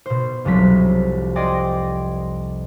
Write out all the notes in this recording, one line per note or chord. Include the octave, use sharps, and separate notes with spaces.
B2 C5
F1 C2 F3 F#3 B6
D5 D#5 G5 C6 G#6 A#6